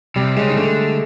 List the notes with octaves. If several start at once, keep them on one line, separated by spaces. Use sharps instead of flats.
C3 G3
C#3 G#3
D#3
D3 A3